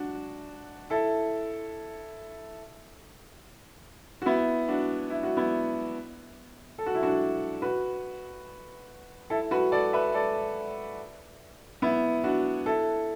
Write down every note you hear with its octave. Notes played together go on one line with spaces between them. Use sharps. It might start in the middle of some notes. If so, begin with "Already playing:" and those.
Already playing: D4 F#4
E4 A4
F#4
B3 E4
D4 F#4
E4
F#4
B3 E4
A4
F#4
E4
D4 F#4
F#4 B4
E4 A4
F#4 B4
A4 D5
B4 E5
A4 D5
B3 E4
D4 F#4
E4 A4